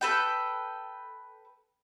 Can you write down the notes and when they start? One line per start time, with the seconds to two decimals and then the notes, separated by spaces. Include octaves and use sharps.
0.01 A4 B4 G5